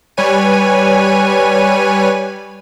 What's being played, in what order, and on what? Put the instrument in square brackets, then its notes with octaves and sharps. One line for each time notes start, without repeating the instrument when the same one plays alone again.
[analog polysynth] G3 B4 C#5 G#5 D#7